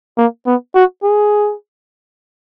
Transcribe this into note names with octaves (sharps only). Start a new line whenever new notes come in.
A#3
B3
F#4
G#4